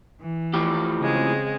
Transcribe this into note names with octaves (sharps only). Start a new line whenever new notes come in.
E3
A2 F3 G4
C#3 G#3 C4